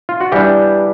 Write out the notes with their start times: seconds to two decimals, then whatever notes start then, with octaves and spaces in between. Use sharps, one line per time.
0.09 F4
0.21 F#4
0.32 E3 G3 B3 D4 G4